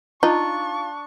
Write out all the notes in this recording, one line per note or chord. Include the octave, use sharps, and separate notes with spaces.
D4 D#4 F4 C#6